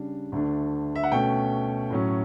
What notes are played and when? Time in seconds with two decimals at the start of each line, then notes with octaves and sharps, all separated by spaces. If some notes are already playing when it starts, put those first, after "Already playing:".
Already playing: C#3 G3 D4
0.32 D2 D3 A3 D4
0.95 E5
1.04 F#5
1.12 B2 A3 C#4 G5
1.90 A2 F#3 C#4